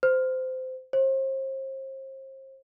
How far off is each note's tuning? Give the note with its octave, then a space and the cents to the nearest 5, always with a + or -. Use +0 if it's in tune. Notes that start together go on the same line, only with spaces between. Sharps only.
C5 -20
C5 +35